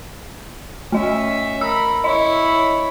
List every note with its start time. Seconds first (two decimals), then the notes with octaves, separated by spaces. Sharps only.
0.92 A3 C#4 D#5 E5
1.61 A#4 B5 E6
2.04 E4 C#5 D#5